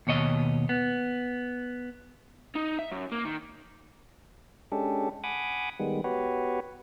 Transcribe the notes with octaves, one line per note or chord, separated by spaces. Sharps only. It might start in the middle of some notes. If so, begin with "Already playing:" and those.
D#2 B2 C#5 D#5
B3
D#4
E5
F#2
A#3
D#3
G#3 C#4 D4 G4 A4
F#5 G#5 B5 D6 D#6
D#3 G3 G#3 B3
B3 F#4 G4 B4 C#5